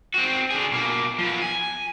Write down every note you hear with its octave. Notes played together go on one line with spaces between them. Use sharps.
C4 F#4
D3 G#4
B2 A#3
F3 B3
G#5